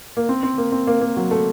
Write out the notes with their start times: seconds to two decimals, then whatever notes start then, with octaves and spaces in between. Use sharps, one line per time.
0.17 A#3
0.29 C4
0.43 C4
0.58 A#3
0.72 C4
0.87 A#3
1.01 A#3
1.16 F#3
1.31 A3